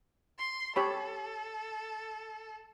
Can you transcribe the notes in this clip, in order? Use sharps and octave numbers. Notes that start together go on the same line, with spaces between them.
C6
G4 A4 C#5 B5